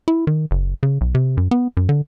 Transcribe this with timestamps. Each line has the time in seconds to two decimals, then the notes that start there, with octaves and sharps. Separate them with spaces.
0.08 E4
0.27 D#3
0.51 F#1
0.83 C#3
1.01 B1
1.15 C3
1.37 F#2
1.51 B3
1.77 F#2
1.89 D3